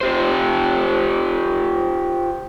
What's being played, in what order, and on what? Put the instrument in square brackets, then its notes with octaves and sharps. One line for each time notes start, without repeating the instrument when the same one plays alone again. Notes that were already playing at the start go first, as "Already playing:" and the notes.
[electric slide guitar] F4 G4 C5